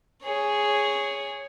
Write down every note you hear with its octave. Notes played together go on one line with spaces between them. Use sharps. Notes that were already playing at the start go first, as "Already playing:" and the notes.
G#4 C#5